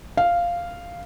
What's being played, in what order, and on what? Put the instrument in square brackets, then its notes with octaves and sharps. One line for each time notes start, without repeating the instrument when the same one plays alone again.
[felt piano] F5